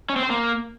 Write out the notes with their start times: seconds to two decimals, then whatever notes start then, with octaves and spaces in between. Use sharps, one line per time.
0.09 C#4
0.16 C4
0.23 C5
0.30 A#3